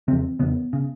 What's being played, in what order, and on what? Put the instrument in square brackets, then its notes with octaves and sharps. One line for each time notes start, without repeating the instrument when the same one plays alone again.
[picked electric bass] E2 C#3 C4
E2 C#3 B3
C#3